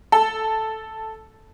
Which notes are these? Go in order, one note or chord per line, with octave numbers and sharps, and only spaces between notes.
A4